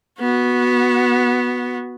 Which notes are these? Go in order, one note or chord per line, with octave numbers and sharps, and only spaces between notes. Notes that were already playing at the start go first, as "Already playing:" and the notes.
B3 F#4